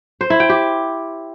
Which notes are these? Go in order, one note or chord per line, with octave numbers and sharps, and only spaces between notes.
C5
E4
G5
G4